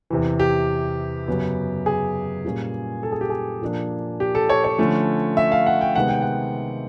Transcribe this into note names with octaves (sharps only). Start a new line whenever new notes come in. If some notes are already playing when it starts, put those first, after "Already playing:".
E2 C3 E3
G4
F#2 C#3 F#3 B3
G#4
A#2 G3 A#3 C#4
A4
G#4
G4
G#4
A#2 F3 A#3 D4
G4
A4
C#5
C#5
D3 F3 A3 C#4
E5
F5
F#5
G5
C3 D#3 G#3 B3 F#5
G5
F#5